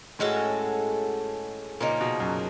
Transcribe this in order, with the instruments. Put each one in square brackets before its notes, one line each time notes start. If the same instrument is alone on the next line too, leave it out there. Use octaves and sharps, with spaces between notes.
[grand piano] A2 [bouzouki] G#3 C#4 F#4 A4
[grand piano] A#2 [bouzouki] C#3 F3 A#3 D#4
[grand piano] B2
F#2